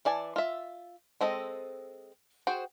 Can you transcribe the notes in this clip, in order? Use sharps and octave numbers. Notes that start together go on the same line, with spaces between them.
E3 D5 G#5 A5
F4 E5
G#3 C4 A4 D#5
F#4 G#4 C5 G5